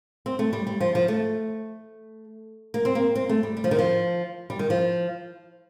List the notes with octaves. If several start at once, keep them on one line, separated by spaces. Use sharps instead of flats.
C4
A3
G3
G3
F3
F3
A3
A#3
C4
A#3
C4
A3
G3
G3
F3
D#3
F3
G3
D#3
F3